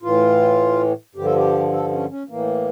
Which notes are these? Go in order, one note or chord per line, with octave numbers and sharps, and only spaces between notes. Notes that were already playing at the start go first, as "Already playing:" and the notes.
A2 E3 F4
G2 D3 F3 G4
A4
G4
A4
C#4
C#4
A2 E3 A#3